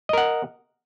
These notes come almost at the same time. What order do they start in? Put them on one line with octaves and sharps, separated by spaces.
D#5 A#4 F#5